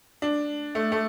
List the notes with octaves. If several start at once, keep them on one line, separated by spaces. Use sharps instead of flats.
D4
A3
A3